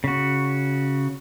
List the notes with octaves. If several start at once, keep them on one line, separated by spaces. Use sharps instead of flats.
C#3 F#4